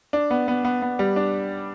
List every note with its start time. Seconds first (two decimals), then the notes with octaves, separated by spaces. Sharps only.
0.13 D4
0.30 B3
0.48 B3
0.65 B3
0.82 B3
0.99 G3
1.16 D4